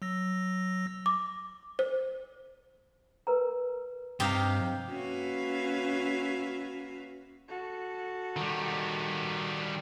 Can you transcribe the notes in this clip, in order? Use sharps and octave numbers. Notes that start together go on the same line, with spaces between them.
F#3 E6 A#6
D6
C5
A#4 B4 A#5
G2 C3 D#4 G4 F5
A#3 C#4 F#4 B4 E5 F5
F#4 A4
D#3 G3